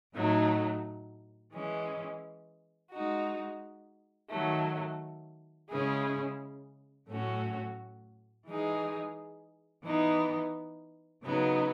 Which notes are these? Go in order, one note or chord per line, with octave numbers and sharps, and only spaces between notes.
A2 F#3 A3 D#4
E3 G#3 C#4
G#3 D#4 F#4
D#3 F#3 A3
C#3 G#3 C#4 E4 G#4
A2 F#3 A3 C#4 F#4
E3 G#3 D#4 G#4
E3 B3 D#4
C#3 F#3 B3 D#4